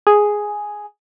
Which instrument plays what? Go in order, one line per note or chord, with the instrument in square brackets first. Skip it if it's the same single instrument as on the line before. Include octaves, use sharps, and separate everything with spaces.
[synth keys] G#4